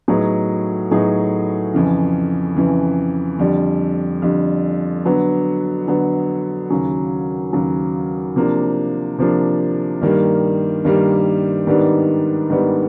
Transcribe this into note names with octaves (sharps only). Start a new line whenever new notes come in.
A2 F#3 B3 D#4 G#4
A2 F#3 B3 D#4 G#4
F2 C#3 E3
F2 C#3 E3
F2 D3 G3
F2 D3 G3
D3 F#3 B3
D3 F#3 B3
D#2 C#3 F#3
D#2 C#3 F#3
C3 F3 A#3 D4
C3 F3 A#3 D4
G2 D#3 G3 A#3
G2 D#3 G3 A#3
G#2 D#3 G3 B3 D4
G#2 D#3 G3 B3 D4